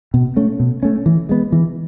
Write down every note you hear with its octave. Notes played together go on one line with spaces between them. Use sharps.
B2
A3 C#4
B2
A3 C#4
E3
G#3 B3
E3